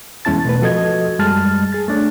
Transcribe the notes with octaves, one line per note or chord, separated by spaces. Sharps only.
E2 G#3 C#4 E4 A5 A6
B2 A3 B4
F3 F#4 A4 D#5 G#6
F#2 G3 G#3 A5 F6 A6
G#4 A6
A3 D4 C#5